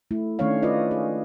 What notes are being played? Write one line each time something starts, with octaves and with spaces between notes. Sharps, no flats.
A3 E4
D#3 A3 C#4 D4 C#5 F5
F4 B4 D5 D#5
G#4